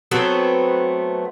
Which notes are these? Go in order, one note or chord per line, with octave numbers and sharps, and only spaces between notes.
F#3 A3 B3 C4